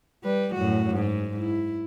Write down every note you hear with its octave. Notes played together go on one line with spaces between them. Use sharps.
G3 B4
F#2 A2 F#4
G#2 G#3
E4